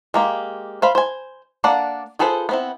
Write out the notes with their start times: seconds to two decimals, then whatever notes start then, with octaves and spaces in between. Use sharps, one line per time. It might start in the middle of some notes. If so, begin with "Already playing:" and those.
0.14 G#3 A#3 G4
0.82 C5 F5 B5
0.95 C5 G#5
1.64 A#3 D4 A4 D5 F#5
2.19 F4 G#4 A4 B4 C5
2.49 B3 C4 E4